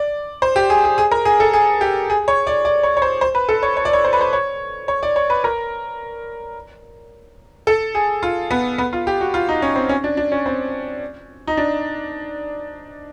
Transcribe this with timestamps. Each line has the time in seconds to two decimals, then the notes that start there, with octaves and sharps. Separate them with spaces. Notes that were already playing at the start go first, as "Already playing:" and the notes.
Already playing: D5
0.42 C5
0.56 G4
0.70 G#4
0.84 G#4
0.98 G#4
1.11 A#4
1.25 G#4
1.40 A4
1.53 G#4
1.81 G4
2.10 G#4
2.28 C#5
2.47 D5
2.65 D5
2.83 C#5
2.97 C#5
3.02 C5
3.21 C5
3.35 B4
3.49 A4
3.63 C#5
3.77 C#5
3.85 D5
3.93 C#5
4.04 C5
4.13 B4
4.21 C5
4.33 C#5
4.88 C#5
5.03 D5
5.16 C#5
5.30 B4
5.44 A#4
7.67 A4
7.95 G#4
8.23 F4
8.51 B3
8.78 B3
8.93 F4
9.07 G4
9.21 F#4
9.34 F4
9.49 D#4
9.62 C#4
9.76 C4
9.89 C#4
10.04 D4
10.17 D4
10.32 C#4
10.46 C4
11.47 D#4
11.57 D4